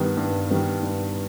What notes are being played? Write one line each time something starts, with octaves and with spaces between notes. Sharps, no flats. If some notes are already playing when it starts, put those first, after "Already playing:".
Already playing: G2 D#3 G3 B3
G2
D#3 G3 B3
G2